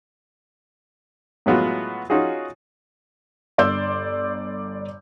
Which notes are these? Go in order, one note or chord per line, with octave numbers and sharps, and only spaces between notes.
A2 F#3 G#3 B3 F4 F#4
C#4 D#4 F4 F#4 G#4
G1 D5 C6 E6 G6